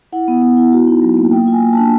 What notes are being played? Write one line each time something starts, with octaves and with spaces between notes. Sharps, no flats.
E4 F#5
B3
B3
E4
F#4
D#4
F#3
A#3
A#3 G5
F4
G#5
A#3
A5
D4